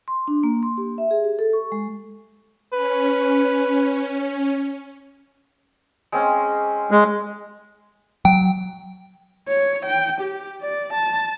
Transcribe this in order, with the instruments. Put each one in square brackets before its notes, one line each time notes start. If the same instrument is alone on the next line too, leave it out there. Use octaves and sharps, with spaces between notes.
[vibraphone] C6
D4
A#3
C6
G4
E5
G#4
G4
A4
C#6
G#3
[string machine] C#4 [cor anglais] B4
[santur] G#3 C4 C#4
[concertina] G#3
[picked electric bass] F#3 [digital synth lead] G5
[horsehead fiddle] C#5
G5
G4
D5
A5